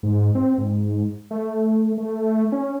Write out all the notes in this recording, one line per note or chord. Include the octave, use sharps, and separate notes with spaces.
G#2
C4
G#2
A3
A3
C#4